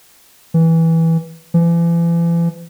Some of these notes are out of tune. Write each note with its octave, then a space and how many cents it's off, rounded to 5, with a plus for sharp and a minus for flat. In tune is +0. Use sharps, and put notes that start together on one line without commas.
E3 -10
E3 +40